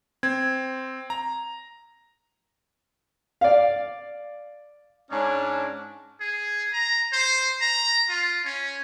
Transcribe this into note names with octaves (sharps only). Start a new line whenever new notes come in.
C4 G#6
A#5
D5 F5
G#2 C#4 D4 C#5
G#4
A#5
C5
A#5
F4
C#4